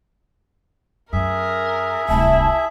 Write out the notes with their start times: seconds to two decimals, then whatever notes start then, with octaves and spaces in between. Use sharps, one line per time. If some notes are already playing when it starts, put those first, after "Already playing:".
1.13 F#2 G#4 A#4 E5
2.09 D1 C2 E4 A5